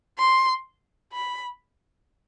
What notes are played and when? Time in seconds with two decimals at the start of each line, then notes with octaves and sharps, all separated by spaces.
0.19 C6
1.13 B5